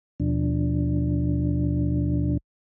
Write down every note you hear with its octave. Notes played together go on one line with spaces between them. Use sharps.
D#2 B2 F3 D4